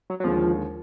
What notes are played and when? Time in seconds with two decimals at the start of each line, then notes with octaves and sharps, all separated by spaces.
0.10 F#3
0.20 F#3
0.24 D#2 D3 F3 G#3